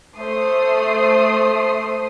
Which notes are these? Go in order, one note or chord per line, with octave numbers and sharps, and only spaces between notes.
A3 C5 D#6 C7